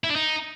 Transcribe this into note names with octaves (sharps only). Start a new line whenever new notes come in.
E4
D4
D#4